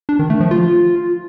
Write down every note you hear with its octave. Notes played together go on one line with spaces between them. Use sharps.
D4
D#3
A3
F3
F4